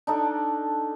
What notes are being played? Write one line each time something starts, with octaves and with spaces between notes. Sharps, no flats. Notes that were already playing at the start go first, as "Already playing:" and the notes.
D4 D#4 A4